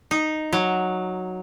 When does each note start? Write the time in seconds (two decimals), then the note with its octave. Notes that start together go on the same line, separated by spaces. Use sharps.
0.11 D#4
0.53 F#3